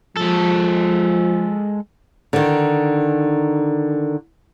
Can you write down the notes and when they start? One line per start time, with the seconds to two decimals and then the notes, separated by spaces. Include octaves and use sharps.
0.17 F3 G#3 A4
2.33 D3 D#3